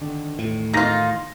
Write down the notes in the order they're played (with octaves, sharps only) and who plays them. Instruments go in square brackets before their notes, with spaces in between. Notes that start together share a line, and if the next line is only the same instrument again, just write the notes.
[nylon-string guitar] D3 D#3 D4
[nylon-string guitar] E2 D#3 [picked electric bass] A2
[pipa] A#3 F4 [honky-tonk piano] D#4 A#6